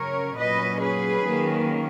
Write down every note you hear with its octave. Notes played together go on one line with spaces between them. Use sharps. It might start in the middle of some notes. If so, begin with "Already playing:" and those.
Already playing: C#3 F#3 C#4 A#4 C#5
A#2 F#3 C#4 B4 D#5
G#4 B4
D#3 F#3 A#3 C#4